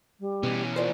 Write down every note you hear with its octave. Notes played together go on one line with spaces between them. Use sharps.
G3
B2 E3 C#4
A#3 D4 F4 C5